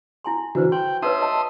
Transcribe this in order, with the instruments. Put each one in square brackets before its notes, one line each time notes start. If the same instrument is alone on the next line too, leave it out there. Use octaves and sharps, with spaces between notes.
[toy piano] E4 G#5 C6
[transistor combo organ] D3 E3 [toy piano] F#4 B4 C5
[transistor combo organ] G5 [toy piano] C6
[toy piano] D#4 B4 C#5 [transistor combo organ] E5 C6 D#6
[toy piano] D#5 A5